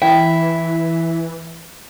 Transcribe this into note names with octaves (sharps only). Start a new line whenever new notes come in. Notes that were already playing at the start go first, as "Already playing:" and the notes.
E3 E4 G5